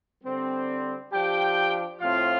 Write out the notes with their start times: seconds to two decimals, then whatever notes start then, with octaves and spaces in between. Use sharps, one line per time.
0.24 D3 G3 C4
1.12 F3 D4 G4 G5
2.01 A2 F3 C4 F4 F5